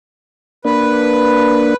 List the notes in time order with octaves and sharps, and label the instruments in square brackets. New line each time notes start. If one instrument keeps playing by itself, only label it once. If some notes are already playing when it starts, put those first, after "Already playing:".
[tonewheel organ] A#3 D4 [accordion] B4